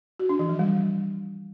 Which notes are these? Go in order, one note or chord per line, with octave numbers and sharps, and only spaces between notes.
F#4
D4
E3
F3
G3